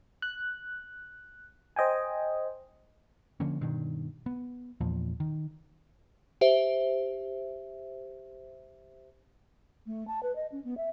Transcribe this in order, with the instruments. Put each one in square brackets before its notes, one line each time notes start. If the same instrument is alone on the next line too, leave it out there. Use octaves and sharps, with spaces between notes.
[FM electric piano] F#6
C5 D#5 G5 G#5
[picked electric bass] D3 F3 A#3 C#4
G2 B2 D#3
B3
E2 A#2 F3
D#3
[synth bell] G4 C5 E5
[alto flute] A3
A5
B4
D#5
C#4
B3
E5